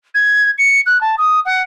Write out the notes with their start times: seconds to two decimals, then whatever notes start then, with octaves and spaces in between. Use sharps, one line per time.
0.14 G#6
0.58 C#7
0.86 F#6
1.01 A5
1.18 D#6
1.45 F#5